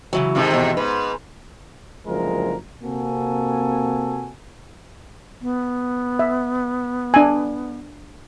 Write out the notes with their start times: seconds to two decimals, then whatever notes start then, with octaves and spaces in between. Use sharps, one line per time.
0.13 C#3 E3 F#3
0.35 G#2 C3 D#3
0.51 B2 E3
0.77 G#2 B4
2.06 F#1 D2 F3 G#3 A#4
2.83 C3 A#3 C4 F#4 A4 G#5
5.42 B3
6.19 E5
7.14 D4 G#5